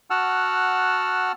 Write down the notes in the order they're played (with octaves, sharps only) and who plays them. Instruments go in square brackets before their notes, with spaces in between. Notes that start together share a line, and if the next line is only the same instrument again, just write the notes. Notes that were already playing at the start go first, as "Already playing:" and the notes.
[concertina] F#4 F#5 A5 E6 F6